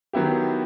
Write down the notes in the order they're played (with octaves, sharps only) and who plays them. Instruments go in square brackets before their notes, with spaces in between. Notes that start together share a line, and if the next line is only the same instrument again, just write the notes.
[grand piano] D#3 F#3 B3 E4 G4